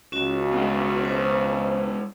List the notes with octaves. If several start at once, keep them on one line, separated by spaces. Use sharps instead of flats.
C#2 C#4 F#4
B2 G#3
C5